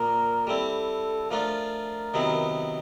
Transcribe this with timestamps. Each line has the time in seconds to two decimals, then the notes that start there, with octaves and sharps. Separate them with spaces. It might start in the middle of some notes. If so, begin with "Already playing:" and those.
Already playing: A#2 F3 A#3 A#4
0.47 G3 C4 E4 A4
1.31 F3 A3 D4 F4 A#4
2.14 C3 D#3 F#3 B3 E4